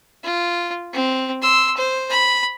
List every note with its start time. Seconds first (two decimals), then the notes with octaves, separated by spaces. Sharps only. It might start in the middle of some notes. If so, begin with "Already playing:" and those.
0.24 F4
0.93 C4
1.42 C6 E6
1.77 C5
2.10 B5